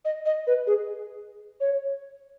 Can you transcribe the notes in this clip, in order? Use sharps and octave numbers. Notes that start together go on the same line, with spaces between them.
D#5
D#5
B4
G#4
C#5